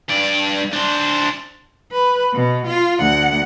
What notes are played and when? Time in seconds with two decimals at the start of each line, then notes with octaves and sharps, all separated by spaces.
0.09 G2 D5
0.73 D4 C5
1.92 B4
2.33 B2
2.67 F4
3.00 D2 F#5